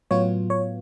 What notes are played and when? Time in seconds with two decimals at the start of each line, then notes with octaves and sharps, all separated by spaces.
0.11 A2 F#3 B3 F4 C#5
0.50 C#5